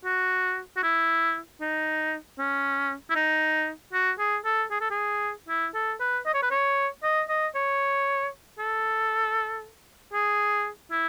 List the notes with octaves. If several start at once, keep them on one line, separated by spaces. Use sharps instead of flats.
F#4
F#4
E4
D#4
C#4
E4
D#4
F#4
G#4
A4
G#4
A4
G#4
E4
A4
B4
D#5
C#5
B4
C#5
D#5
D#5
C#5
A4
G#4
E4